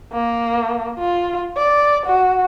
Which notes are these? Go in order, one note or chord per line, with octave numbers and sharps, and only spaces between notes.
A#3
F4
D5
F#4